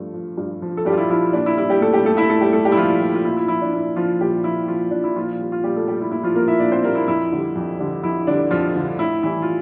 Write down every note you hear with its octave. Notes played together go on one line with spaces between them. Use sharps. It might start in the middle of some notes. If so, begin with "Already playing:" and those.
Already playing: G2 F3 A3
F3
G2
F3
A4
G2 G3 G4
F4
E4
F3 E4
A#2 D4
E4
G3 E4
G3 G4
A#2 A3 A4
G3 G4
G3 A3 A4
E4 E5
A#2 A3 A4
G3 G4
G3 A3 A4
G3 G4
E4
A#2 F3 F4
G3
F4
A#2 E4
F4
E4
F3 E4
D4
A#2 E4
F3 F4
A#2 G3 G4
F3 E4
A#2 F3 F4
F3 D4
E4
A#2 F3 F4
G3
F4
A#2 G3 G4
A3 A4
G3 G4
E4
A#2 E4
F3 F4
G3 A#3 A#4
E4 E5
A#2 D4 D5
C4 C5
G3 A#3 A#4
E4
F2 E4
D3 G3
F2
D3 G3
F2 E4
D3 G3 D4
F2 F3 F4
D3 G3
A2 E4
E3 G3 E4
F4